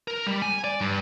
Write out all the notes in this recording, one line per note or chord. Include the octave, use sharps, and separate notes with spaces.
A#4
G3
G#5
D5
G2